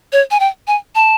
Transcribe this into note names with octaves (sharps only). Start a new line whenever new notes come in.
C#5
G#5
G5
G#5
A5